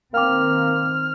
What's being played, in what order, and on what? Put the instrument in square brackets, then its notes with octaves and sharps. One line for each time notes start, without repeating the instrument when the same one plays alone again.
[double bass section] D#3 C4 [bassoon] A#3 [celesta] F5 G5 D6 [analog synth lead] F6